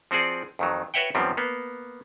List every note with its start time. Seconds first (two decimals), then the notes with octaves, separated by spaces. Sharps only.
0.11 F3 C4 F#4 G#4 D5
0.59 F2 D#3 F#3
0.94 F#4 B4 C#5 E5 F#5 G5
1.15 F#2 D#3 F3 G3 B3 C4
1.37 A#3 B3